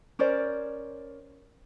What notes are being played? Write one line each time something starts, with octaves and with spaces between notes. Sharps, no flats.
C#4 A#4 C5 D5